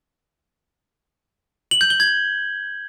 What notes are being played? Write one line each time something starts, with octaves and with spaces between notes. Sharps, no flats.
F#7
G6
G7
G#6